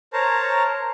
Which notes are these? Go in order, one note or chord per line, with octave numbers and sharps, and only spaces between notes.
A#4 C5 C#5 A5 A#5